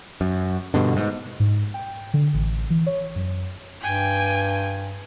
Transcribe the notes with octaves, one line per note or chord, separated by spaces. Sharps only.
F#2
G2 B2 D3
G#2
G#2
G5
D3
A1
E3
C#5
F#2
G2 G5 G#5